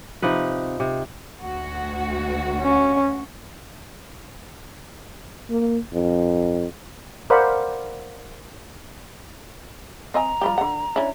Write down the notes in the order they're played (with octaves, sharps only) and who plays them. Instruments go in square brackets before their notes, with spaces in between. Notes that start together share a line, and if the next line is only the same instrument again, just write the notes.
[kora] C3 F3 D#4 B4
C3
[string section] D2 F#4
[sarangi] C#4
[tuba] A#3
F2
[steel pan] A#4 C5 D5 F5 F#5 B5
[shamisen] C4 D#5 G#5 [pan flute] A#5
[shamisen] F3 G3 G4
D3 F#5
C#4 D4 E4